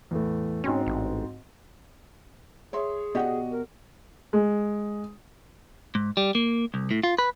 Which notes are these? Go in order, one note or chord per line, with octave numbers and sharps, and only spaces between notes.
E2 A2 A3
G#2 C4 C#4 F#4
A1
G#4 C#5 E5 C6
B2 F#4 G4 D5 D#5 F#5
A#4
G#3
G#2
G3
A#3
C2
A2
F4
B4